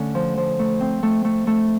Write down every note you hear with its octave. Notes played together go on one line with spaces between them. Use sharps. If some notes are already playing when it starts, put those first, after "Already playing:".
Already playing: D3 A3 C#4
F3
F3
A3
C4
A3
A3
A3